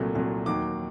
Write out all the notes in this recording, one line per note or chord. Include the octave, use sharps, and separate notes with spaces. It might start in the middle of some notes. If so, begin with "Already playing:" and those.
Already playing: C2 A#2 F#3 A3
C2 A#2 F#3 A3
D#2 D#3 F#3 D6